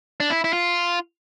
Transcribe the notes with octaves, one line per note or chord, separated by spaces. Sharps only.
D4
E4
E4
F4